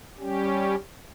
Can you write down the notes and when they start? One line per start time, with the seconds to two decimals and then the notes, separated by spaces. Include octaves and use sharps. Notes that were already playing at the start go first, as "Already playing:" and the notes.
0.18 G3 C#4 G4